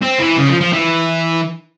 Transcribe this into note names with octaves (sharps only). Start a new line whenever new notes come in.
C4
E3
C#3
F3
F3
E3